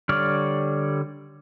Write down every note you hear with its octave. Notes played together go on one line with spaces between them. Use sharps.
D3 G3 C#5 D5 F6